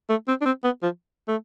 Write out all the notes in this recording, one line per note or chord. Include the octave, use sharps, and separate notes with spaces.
A3
C4
D4
C4
B3
F3
A3